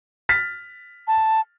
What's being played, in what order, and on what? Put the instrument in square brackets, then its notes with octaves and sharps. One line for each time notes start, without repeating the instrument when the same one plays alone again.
[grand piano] F6 A6 B6
[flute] A5